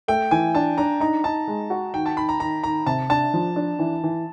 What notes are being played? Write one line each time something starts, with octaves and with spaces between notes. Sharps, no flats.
A3 G5
E3 G#5
D4 A5
D4 A#5
D#4 A#5
D#4 A5
G#3
F#4
D#3 G5
A5
D#3 B5
A#5
D#3 A#5
D#3 A#5
C3 A5
D4 A5
F3
D4
E3
E3